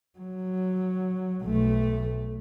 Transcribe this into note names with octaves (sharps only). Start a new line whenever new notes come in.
F#3
B1 A3